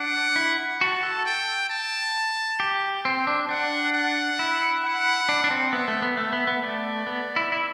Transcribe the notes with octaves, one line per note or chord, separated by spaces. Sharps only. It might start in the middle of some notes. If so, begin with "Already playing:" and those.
Already playing: D4 F#5
E4
F#4 A5
A4
G5
A5
G4
C4 G5
D4
D4 F#5
F#5
E4
F#5
D4
D4
C4
B3 E5
A3
B3
A3 E5
B3
B3
A3 D5
B3
E4
E4